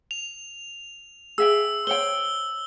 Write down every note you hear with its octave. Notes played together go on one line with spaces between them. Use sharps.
F7
G#4 E5 G5 E6
C5 C#5 G5 G7